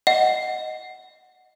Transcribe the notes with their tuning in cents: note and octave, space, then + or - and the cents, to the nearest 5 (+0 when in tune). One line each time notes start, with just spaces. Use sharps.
D#5 +0 F#5 +5